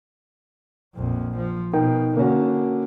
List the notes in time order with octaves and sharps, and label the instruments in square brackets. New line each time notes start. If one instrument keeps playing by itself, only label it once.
[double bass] A#1 F2
F3
[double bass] B2 [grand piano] D#4 A#4 G5
[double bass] D3 [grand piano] A#3 C#4 F#4